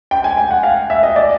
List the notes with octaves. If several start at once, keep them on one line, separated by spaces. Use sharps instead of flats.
G5
G#5
G5
F#5
F5
E5
D#5
D5